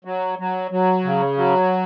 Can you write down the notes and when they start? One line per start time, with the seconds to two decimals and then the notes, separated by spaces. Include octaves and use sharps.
0.05 F#3
0.39 F#3
0.71 F#3
1.04 C#3
1.37 F#3